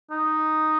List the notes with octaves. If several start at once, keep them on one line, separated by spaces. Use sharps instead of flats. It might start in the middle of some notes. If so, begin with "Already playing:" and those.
D#4